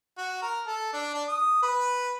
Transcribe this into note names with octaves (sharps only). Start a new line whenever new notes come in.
F#4
A#4
A4
D4
D4
D#6
B4